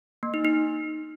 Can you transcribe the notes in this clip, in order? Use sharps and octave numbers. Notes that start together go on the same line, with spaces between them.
A#3
D#4
D#4